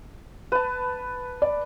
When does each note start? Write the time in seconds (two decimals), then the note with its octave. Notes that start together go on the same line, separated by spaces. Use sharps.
0.52 B4 A5
1.42 D5